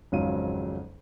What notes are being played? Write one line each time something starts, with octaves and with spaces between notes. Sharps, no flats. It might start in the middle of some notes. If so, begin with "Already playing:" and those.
G#1 F2 C#3 F#3 F5 D#7